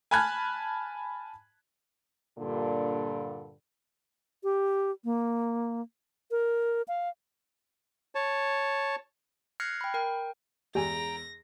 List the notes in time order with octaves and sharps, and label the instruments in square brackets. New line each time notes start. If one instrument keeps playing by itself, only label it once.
[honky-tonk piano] G#5 A5 B5 F6 F#6 G#6
[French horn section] G2 A#2 D3
[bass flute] G4
A#3
A#4
F5
[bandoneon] C#5 A5
[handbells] F6 F#6 G#6 A#6 C7 C#7
G5 B5
A#4 G5
[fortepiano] E2 G#3 [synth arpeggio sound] G4 G#5 [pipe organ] G5 A#5 [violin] A#6